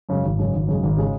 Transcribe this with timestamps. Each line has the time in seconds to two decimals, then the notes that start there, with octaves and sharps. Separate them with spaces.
0.09 F#2 C#3 G#3
0.24 G#1
0.39 F#2 C#3 G#3
0.53 G#1
0.68 F#2 C#3 G#3
0.83 G#1
0.97 C#3 G#3